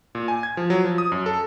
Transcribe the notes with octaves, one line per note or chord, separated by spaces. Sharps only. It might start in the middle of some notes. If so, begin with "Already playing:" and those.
A#2
G#5
G#6
F3
F#3
F3
D#6
F#2
A4